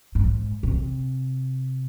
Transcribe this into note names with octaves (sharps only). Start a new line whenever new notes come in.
G#2
C3